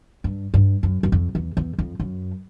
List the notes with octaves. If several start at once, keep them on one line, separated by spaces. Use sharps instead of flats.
G2
G2
F#2
F#2
F2
E2
E2
F2
F#2